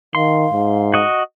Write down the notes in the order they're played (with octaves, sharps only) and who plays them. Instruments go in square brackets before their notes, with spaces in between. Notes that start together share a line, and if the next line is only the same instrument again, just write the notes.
[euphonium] D#3 [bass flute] F5 [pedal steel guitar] C6
[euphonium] G#2
[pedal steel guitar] F#4 D#5